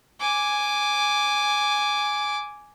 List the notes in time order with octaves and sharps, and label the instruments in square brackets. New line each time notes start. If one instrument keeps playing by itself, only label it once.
[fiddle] G#5 D6